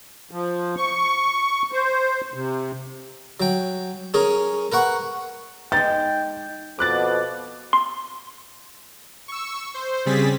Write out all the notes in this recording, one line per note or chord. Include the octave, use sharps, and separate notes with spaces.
F3
C#6
C5
C3
F#3 G5
C#4 G#4 A#4
A#4 B4 F#5 C#6
G#3 D#4 G5 A6
F2 B2 D6 F#6 A6
C6
C#6 E6
C5
C#3 G3 C4 G#4 A6 B6